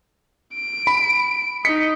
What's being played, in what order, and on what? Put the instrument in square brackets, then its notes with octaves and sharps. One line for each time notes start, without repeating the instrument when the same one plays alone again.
[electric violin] D7
[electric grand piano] B5
[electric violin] D#4 D#5 [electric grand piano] B6 C#7